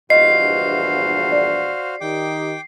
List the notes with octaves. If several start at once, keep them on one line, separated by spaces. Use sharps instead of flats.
A#1 E2 G2 F#4 C5 D#5 F5 C7
D5
D#3 D#4 G4 G5 D6